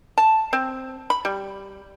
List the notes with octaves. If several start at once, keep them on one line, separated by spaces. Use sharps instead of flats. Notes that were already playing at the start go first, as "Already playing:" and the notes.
A5
C4
B5
G3